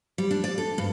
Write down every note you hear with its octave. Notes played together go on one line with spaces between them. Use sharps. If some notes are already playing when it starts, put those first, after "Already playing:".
G3
D4
D5
A4
G2